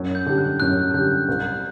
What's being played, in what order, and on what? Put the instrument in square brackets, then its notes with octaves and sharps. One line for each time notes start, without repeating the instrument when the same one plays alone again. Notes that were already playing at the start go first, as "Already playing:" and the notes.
Already playing: [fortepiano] F#2
[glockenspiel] G6
[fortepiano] D3 G3
[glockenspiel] F#6
[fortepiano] F#2 [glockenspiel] F#6
[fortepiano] D3 G3 [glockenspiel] G6
[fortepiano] C2